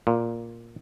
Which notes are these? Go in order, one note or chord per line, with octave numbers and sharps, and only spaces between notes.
A#2